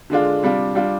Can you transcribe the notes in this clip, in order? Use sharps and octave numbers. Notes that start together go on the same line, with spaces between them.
D3 G#3 D4 F4
C3 G3 D4 F4
G3 D4 F4